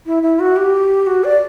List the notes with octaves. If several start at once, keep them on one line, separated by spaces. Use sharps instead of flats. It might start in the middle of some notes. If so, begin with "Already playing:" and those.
E4
E4
F#4
G4
F#4
D5